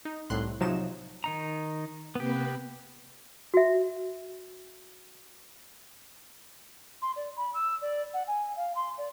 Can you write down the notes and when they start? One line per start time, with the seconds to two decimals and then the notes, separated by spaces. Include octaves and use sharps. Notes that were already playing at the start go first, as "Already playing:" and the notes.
0.05 D#4
0.30 C2 A2 C6 F#6
0.60 C3 F3 F#3 D#4 E7
1.24 D#3 D#4 A#5
2.15 C3 A#3 B3 G4 B4
3.54 F#4 E5
7.02 C6
7.16 D5
7.37 B5
7.54 E6
7.82 D5
8.14 F#5
8.27 G#5
8.56 F5
8.76 C6
8.98 D5